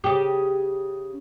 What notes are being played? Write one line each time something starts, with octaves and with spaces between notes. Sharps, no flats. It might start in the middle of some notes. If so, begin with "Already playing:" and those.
C#3 G4